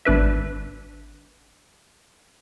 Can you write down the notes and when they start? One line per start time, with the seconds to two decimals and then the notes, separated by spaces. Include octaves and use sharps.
0.05 G#1 D4 B4 E5